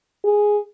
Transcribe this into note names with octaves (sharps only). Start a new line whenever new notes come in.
G#4